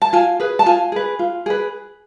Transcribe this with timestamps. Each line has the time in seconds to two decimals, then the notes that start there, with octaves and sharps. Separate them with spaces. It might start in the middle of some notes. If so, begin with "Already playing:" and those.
0.02 A5
0.13 F4 G#5
0.40 G#4 B4
0.59 A5
0.66 F4 G#5
0.92 G#4 B4
1.19 F4
1.46 G#4 B4